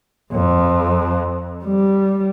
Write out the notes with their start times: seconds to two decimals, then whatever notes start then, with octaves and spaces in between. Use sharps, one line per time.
0.32 F2
1.64 G3